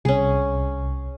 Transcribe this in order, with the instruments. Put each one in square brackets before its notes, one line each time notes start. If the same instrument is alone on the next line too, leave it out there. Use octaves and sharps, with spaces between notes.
[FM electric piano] C2 [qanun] C#4 G#4